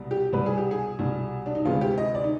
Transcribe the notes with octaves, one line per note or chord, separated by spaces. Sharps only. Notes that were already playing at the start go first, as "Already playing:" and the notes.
Already playing: C2 B2 G3
G4
C2 B2 G3 B4
G#4
G4
G#4
C2 B2 G3
D4
D#4
D2 C3 D#3 G#3 B3 F4
G4
D#5
D5
D#4